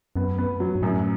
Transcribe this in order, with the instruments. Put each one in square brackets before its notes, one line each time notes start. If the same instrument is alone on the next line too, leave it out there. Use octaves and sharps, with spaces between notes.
[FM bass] F#2 [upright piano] B3
[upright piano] B3
F#3
[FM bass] G2
[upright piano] F#2 [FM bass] A2